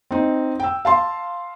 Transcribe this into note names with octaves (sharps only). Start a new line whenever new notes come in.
C4 D#4
G5 E6
F5 A5 C6